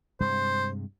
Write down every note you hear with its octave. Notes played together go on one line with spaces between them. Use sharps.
G2 C3 G#3 C5